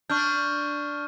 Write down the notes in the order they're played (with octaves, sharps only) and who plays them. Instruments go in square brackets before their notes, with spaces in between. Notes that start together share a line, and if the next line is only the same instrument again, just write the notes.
[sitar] D4 [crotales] C#6 F6 G6